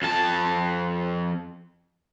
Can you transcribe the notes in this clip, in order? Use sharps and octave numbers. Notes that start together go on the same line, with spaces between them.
F2 A5